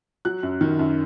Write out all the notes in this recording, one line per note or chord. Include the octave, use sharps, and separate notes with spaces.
F#3 F#6
F#2
D#3
F#2